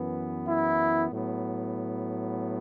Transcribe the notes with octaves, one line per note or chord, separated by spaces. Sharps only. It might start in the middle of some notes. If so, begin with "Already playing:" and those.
Already playing: F#2 E3 B3
E4
A2 F#3 B3